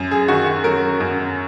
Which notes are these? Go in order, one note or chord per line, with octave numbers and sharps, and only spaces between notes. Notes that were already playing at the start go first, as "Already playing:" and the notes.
Already playing: F#2
G#4
D#3 F#4
F#4
F#3 A#4
F#2